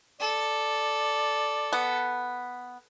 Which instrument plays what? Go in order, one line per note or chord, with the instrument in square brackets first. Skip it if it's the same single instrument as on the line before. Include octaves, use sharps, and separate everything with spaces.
[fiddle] A4 [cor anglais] D5
[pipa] B3